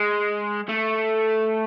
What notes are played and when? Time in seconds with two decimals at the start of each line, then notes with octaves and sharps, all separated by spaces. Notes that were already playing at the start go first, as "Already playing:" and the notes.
Already playing: G#3
0.69 A3